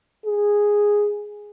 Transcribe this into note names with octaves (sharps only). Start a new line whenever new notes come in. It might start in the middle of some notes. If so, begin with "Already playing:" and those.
G#4